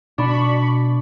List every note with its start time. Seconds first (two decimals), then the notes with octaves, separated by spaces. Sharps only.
0.18 B2 D4 D5 B5 C#6